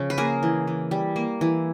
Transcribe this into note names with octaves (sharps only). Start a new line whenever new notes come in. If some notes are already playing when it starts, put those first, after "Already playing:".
Already playing: C#3 F3
B4
A#3 G#4 A#4
E3
E3
G3
A#3
E3